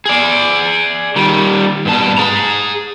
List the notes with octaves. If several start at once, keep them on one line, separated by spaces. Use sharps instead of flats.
G#4 D5
D#3 G3
G2 B2 A5
G#4 A#5